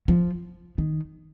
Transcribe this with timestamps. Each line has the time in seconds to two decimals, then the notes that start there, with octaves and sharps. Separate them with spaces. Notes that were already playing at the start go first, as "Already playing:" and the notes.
0.08 F3
0.78 D#3